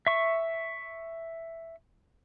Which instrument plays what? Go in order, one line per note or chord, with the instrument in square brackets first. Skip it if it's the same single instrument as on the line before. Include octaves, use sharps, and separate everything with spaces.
[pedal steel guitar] E5 C#6